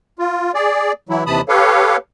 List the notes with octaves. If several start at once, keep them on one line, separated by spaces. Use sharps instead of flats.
F4
G#4 D5
E3 F#3 E4
D#2 C3 E3 A5 B5 D#6
G4 A4 B4 C#5 F5